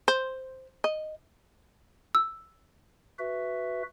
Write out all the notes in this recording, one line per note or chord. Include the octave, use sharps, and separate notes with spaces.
C5
D#5
E6
F#4 B4 E5